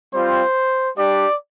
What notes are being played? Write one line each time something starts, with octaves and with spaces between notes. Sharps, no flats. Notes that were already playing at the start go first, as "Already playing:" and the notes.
G3 C4 F4 C5
G3 D4 G4 D5